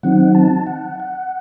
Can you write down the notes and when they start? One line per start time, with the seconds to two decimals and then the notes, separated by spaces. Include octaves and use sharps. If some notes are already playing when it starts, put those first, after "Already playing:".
0.03 D#3 F#3 C4 D#4 F#5
0.35 A5
0.67 F#5
1.00 F#5